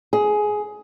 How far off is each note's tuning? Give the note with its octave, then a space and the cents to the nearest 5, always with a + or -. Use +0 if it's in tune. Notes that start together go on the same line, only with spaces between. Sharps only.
G#4 +15